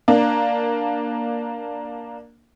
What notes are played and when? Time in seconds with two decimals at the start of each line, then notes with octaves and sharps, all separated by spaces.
0.08 A#3 D4